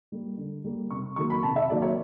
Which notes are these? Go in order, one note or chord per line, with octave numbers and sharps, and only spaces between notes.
G3 A#3
D3
G3 A#3
C3 C#6
D#3 F#3 A#3 C#6
B5
C3 A5
E5
D#3 F#3 A#3 D5
C#5